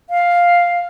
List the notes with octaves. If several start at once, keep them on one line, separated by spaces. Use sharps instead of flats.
F5